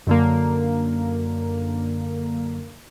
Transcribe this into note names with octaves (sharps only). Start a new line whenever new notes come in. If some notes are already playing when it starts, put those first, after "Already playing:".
F#2 D3 A#3